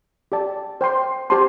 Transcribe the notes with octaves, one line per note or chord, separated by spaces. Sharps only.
G4 D5 A5
C5 G5 C6
G4 C5 A5 C6